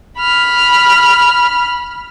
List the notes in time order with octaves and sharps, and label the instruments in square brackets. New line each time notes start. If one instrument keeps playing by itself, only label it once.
[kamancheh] B5 F6